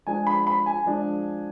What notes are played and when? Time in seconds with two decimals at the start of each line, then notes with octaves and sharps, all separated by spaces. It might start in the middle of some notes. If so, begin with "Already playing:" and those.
0.07 F3 G#3 D4 G#5
0.27 B5
0.47 B5
0.66 G#5
0.86 F3 G#3 D4